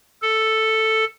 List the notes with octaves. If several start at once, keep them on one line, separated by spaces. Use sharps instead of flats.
A4